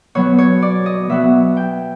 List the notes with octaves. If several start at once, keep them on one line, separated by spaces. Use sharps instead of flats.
B2 F#3 B3 C#5
C#5
D5
D#5
B2 F#3 B3 E5
G5